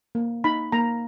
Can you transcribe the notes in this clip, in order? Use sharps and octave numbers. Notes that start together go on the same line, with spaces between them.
A#3
D#4 B5
A#3 A#5